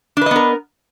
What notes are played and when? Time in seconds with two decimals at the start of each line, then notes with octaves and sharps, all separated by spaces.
0.17 D4
0.21 B4
0.26 D#5
0.31 B3
0.36 A#4